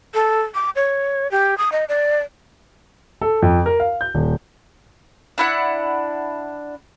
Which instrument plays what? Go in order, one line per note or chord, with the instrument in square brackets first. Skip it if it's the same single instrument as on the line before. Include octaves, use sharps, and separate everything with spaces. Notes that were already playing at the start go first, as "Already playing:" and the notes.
[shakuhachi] A4
D6
C#5
G4
D#6
D#5
D5
[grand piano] A4
F2
A#4
F5
G6
D#1
[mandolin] D4 E4 F#5